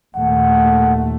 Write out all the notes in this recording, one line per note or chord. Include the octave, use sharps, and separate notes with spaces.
D#2 A#2 A3 F#5